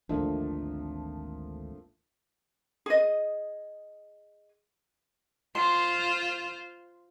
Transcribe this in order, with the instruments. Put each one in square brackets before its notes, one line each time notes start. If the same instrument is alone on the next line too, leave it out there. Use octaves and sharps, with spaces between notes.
[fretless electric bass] G#1 D2 [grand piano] F3 A3 A#3 [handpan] D4
[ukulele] G#4 D#5
[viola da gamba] F4 C5 [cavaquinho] C6